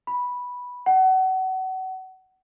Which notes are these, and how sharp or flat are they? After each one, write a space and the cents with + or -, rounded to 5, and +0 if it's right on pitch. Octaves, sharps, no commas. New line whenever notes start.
B5 -5
F#5 +30